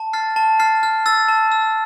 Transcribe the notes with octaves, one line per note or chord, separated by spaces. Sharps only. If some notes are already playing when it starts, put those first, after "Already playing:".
Already playing: A5
F6 A6 C7
A5
F6 A6 C7
F6
E6 A6
A5
E6